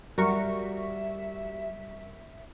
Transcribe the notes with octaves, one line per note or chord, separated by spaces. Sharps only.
G3 F#4 A#4 E5 C#6